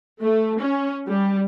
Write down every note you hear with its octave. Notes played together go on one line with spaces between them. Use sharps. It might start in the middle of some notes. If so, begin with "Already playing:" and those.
A3
C#4
G3